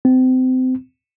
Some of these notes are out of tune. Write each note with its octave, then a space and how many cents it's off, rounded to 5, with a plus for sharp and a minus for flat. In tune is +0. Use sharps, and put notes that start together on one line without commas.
C4 -30